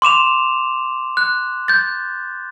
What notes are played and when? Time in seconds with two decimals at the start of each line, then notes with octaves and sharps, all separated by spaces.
0.02 C6 D6 E7 F7
1.17 F#6
1.68 G6 A6